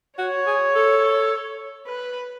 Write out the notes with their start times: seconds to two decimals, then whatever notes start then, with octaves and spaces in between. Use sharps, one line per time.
0.18 F#4 C#5
0.47 G#4
0.75 A4
1.87 B4